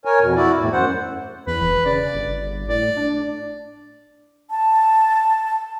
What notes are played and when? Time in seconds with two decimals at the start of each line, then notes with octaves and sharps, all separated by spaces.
0.05 A#4 C#5 G#5
0.20 F2 B2
0.36 E4 F#4 D5
0.58 E2 A2
0.72 F#2 C5 F#5
1.47 E2 B4
1.61 E1
1.86 C#3 D5
2.14 G1
2.68 A2 D5
2.97 D4
4.51 A5